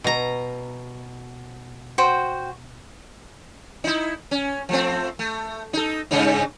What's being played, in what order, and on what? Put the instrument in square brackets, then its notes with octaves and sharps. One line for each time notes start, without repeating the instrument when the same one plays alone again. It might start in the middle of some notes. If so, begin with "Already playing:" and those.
[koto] B2 A#5
[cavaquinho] F#4 C5 G5
[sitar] D#4 E4
C#4
F3 A3 C4
A3
D#4 A4
G2 C#3 D#4